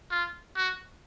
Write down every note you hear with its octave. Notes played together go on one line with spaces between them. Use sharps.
F4
F#4